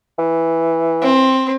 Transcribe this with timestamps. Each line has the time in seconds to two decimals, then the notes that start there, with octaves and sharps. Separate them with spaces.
0.19 E3
1.02 C4